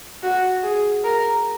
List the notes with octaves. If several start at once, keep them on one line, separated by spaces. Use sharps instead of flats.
F#4
G#4
A#4